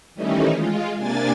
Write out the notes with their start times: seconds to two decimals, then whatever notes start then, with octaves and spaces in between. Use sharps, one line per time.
0.15 D#3 E3 G3 A3 C#4 D#4
0.52 G#3 F4
0.96 C3 A#3 D4 G#5 A6